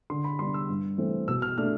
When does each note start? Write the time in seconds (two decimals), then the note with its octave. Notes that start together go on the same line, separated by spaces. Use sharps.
0.10 D3 C6
0.24 B5
0.39 G3 B3 D4 C6
0.54 E6
0.69 G2
0.98 E3 A3 C4
1.27 B2 E6
1.42 F6
1.58 A3 D4 F6